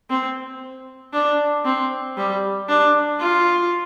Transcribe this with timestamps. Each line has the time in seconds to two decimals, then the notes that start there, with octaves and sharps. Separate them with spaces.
0.10 C4
1.13 D4
1.65 C4
2.17 G3
2.69 D4
3.20 F4